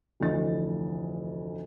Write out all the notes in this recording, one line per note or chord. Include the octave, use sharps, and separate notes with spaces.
F1 D2 E3 D#5 A6